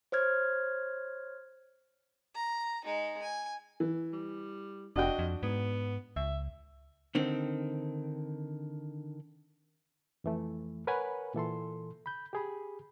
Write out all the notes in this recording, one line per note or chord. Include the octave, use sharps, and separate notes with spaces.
C5 C#5 F6 G#6
A#5
G#3 D#4
G#5
E3
G3
F1 D4 F#4 D#5 G5
F2
G#2 B3
C#2 E5
D3 D#3 C4
F2 E3 A3
A#4 B4 C#5 F#5 G#5 B5
A#2 E3 A4 C6
B5 G6
G4 G#4 B5